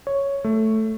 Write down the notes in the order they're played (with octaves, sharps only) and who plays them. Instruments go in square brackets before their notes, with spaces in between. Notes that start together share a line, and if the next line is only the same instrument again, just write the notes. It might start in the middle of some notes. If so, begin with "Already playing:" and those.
[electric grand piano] C#5
A3